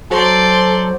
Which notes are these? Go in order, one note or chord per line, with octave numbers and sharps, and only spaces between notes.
F#3 A4 C5 D5 C6